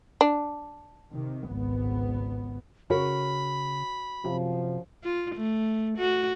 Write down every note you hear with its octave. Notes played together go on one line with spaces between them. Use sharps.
D4
C3 D#3
G#1 C#2 B3
C#3 F#4 A#4 C#5 B5
F#2 C3 F3
F4
A3
F#4